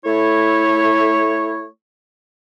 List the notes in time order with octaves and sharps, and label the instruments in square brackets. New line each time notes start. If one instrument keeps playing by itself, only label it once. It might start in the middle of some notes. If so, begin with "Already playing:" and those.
[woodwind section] A3 E4 C#5